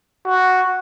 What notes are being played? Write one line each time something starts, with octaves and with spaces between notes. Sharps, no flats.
F#4